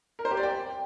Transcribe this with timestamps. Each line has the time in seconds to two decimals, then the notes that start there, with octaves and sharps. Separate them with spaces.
0.19 A#4
0.25 C5
0.31 G4
0.37 D5
0.43 G5